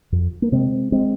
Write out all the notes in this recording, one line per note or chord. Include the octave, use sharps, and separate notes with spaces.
F2
A#3
C3 G#3 C4
G#3 C4